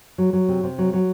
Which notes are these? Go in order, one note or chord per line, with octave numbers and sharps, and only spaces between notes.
F#3
F#3
C3
C3
F#3
F#3